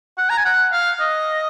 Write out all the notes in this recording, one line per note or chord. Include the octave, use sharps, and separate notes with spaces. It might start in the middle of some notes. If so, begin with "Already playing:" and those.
F#5
A#5
G#5
F#5
F5
D#5